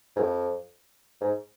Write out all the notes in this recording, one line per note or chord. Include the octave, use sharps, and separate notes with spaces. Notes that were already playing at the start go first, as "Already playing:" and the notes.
G#2
F2
G#2